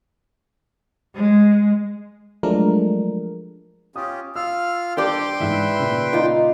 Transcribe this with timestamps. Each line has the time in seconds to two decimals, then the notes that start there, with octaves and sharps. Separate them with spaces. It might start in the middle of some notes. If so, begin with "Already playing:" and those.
1.16 G#3
2.43 F3 F#3 G#3 A3 D4 A#4
3.96 C#4 F4 G4 D#6
4.36 F4 F5 E6 F6
4.97 G2 G3 D4 G4 C5 D5 G5 C6
5.40 G#2 E3 B4 E5
5.78 A#2 C#3
6.13 D#4 F4 D6